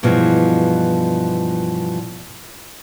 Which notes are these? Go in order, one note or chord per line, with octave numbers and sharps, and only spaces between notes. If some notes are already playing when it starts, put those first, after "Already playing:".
G2 B2 E3 F3 G#3